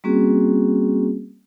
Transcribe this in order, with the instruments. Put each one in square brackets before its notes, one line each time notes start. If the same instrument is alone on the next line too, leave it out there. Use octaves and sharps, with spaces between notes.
[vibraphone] G3 A#3 C4 C#4 F#4 G#4